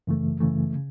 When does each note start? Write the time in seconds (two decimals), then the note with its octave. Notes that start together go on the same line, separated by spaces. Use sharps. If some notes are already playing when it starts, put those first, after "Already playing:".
0.07 F#2 C#3 E3 A3
0.40 F#2 C#3 E3 A3
0.76 C#3